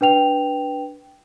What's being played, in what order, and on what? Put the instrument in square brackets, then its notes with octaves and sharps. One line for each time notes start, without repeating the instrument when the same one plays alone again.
[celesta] D4 B4 G5 F7